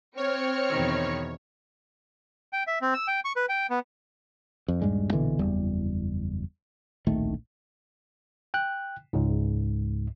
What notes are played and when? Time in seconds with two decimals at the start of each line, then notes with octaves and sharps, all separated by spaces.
0.17 C4 C#5 F6 C#7
0.70 E2 B2 D#3
2.53 G5
2.67 E5
2.82 C4
2.94 E6
3.08 G5
3.25 C#6
3.36 B4
3.49 G5
3.70 B3
4.68 F2
4.82 D#1 G2 G3 G#3
5.13 A#1 B2 D3 E3
5.39 F#1 E2 G3
7.07 D1 A#1 D#3 A3
8.54 G5 F#6
9.13 C#2 G#2